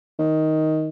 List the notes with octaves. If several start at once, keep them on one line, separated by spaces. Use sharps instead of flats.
D#3